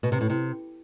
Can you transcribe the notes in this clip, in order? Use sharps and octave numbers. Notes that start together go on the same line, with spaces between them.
B2
C3
A2
C3